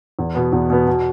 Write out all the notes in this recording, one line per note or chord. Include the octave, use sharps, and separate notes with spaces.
E2
B2 B3
E2
B2 B3
B2